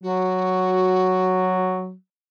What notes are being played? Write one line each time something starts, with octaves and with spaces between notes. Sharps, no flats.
F#3 F#4